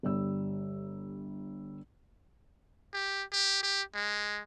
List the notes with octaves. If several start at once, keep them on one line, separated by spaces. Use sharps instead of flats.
G1 G3 E6
G4
G4
G4
G#3